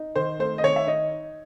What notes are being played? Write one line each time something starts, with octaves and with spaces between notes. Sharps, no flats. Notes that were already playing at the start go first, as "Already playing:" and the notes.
Already playing: D#4
D#3 C5
A3 C5
D#5
D#3 C#5
E5
D#4 D#5